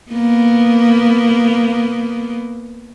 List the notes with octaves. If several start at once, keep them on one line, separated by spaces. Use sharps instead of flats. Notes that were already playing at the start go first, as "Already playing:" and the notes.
A#3 B3